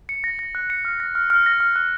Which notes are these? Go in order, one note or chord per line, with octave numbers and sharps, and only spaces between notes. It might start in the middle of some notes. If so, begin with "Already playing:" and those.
C#7
A#6
A#6
F#6
C#7
F6
A#6
F6
F6
A#6
F6
F#6